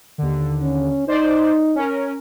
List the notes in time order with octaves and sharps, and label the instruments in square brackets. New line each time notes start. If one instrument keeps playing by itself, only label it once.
[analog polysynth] D#2 D3
[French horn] C#4
[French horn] D#4 [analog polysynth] C5 D5
[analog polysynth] C#4 A#4